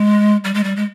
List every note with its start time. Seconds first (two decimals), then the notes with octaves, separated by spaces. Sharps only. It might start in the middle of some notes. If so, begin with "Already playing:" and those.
Already playing: G#3
0.44 G3
0.54 G#3
0.64 G3
0.76 G#3